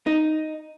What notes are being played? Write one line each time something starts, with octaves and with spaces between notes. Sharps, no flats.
D#4